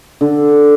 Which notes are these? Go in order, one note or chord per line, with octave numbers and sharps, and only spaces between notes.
D3